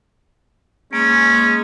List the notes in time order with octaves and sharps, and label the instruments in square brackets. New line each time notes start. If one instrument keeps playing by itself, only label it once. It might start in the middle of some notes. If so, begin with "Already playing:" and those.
[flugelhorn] G#3 [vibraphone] A#3 [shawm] C#4